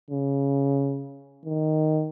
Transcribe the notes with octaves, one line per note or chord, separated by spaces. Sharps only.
C#3
D#3